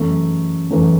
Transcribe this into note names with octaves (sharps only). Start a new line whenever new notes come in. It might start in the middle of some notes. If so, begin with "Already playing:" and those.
Already playing: F#2 C#3 E3 A3
F#2 C#3 E3 A3